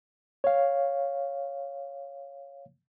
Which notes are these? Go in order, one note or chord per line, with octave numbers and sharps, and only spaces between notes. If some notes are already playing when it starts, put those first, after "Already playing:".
C#5 F5